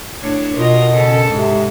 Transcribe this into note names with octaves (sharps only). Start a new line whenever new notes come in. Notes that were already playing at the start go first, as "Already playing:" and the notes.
A2 D4 C#5
B2 F4 A#4 D#5
C#3 A4
G#2 C3